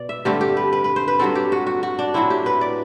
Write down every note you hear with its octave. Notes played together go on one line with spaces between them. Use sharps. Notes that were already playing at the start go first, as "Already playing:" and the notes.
Already playing: B2 D5
E5
G2 D3 A3 C4 G4
G4
B4
B4
B4
C5
B4
G2 F#3 C4 A4
G4
F#4
F#4
F#4
D4
A2 F#3 C4 E4
G4
B4
D5